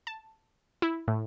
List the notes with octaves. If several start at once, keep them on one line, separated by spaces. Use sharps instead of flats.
A5
E4
A2